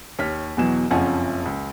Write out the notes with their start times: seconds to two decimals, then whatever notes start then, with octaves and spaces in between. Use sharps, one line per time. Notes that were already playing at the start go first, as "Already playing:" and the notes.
0.19 D#2 C#5 F6 B6
0.57 E2 B2 E3 F#3 E7
0.91 F#1 F2 F3 C#4 F#5 G#5
1.46 C#2